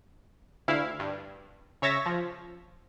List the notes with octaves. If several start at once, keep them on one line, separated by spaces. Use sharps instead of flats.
D2 E4 F5
G2
C#3 C#5 E5 A6 A#6
F3